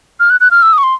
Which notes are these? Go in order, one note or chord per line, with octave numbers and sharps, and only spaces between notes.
F6
F#6
F#6
F6
E6
D#6
C#6
C6